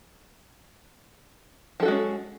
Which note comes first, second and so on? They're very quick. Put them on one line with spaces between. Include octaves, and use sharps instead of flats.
F3 A4 F#4 G#3 C#4